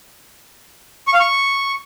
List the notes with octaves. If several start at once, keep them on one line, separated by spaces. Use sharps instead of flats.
C#6
F5
C#6